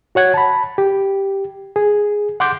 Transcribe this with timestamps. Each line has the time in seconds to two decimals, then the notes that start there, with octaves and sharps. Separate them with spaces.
0.15 F#4 C#5 F#5 G#6
0.34 A5 B5
0.78 G4
1.76 G#4
2.40 F#5 C6 D6 G6